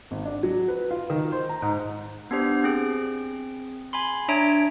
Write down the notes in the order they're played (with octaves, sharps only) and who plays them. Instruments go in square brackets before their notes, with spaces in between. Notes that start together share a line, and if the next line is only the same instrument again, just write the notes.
[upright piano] G#1
D4
F#3
B4
F4
D#3
C5
A#5
G#2
[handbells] B3 D4 G4 C5
C4 G#4
G#5 B5 C6
D4 C#5 E5 A#5 D7